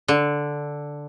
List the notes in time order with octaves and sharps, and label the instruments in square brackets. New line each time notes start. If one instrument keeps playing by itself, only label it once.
[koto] D3